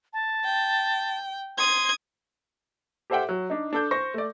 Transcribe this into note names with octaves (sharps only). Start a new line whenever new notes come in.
A5
G5
C6 D#6 G#6
G4 A4 C5 E5 F#5 G5
F#3
D4 D#4
D4 A4 G6
C5 C#6 A#6
A3 D5